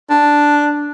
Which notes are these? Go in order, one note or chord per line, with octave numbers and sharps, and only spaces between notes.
D4